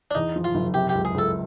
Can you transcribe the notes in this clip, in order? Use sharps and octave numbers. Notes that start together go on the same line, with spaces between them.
D4
E2 D#4
F3
F4
F#1
C3 G4
G4
C#2
G#4
C#2 A4